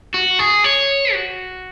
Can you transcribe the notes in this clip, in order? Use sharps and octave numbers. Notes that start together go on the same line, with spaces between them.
F#4
G#4
C#5
F#4